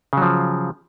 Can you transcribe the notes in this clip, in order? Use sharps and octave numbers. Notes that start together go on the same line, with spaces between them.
C#3 F3 F#3